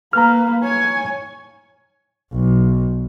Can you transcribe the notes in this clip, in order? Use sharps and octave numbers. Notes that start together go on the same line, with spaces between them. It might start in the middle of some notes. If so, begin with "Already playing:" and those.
A#3 B4 A#5 F6
C#5 G#5
B1